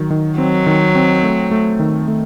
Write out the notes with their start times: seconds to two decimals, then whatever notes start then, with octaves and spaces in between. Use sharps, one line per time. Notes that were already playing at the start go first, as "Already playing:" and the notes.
Already playing: D#3 F#3
0.10 D#3
0.38 F#3 C4
0.66 D#3
0.95 C4
1.23 A3
1.51 A3
1.80 D#3
2.08 A3